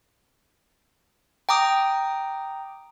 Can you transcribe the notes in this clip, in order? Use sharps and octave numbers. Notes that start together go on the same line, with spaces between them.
G5 A#5 D6 D#6